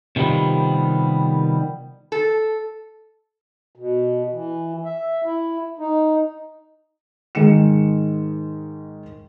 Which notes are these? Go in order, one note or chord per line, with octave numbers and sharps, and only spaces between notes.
C3 D#3 F3 G3 B3
A4
B2
E3
E5
E4
D#4
G#2 D#3 G#3 C#7 E7